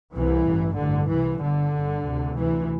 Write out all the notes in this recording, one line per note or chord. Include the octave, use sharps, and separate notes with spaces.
C2 C3 E3
A1 G2
A1 G2 D3
C2 C3 E3
G1 G2 D3
G1 G2
D2 C3
D2 C3 E3